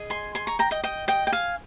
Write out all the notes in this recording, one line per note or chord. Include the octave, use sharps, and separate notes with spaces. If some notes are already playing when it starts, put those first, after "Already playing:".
Already playing: G#4 D#5
G#5 C6
G#5 C6
A#5 C#6
G5 A#5
D#5 G5
D#5 G5
D#5 G5
G5
F5 G#5